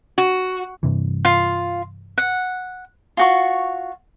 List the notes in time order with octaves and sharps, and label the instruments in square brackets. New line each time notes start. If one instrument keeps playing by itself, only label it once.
[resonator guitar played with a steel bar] F#4
[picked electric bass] G2 C3 E3
[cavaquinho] F4
F#5
F4 F#4 C#6